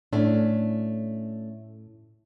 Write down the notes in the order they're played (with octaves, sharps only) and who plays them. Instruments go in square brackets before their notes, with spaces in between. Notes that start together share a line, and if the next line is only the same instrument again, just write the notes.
[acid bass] A2 [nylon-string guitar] A3 C#4 D4